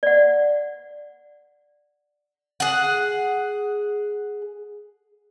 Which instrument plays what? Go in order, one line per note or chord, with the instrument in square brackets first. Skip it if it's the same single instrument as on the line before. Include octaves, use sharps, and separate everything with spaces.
[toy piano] D5 F#5
[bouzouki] G#4 F#5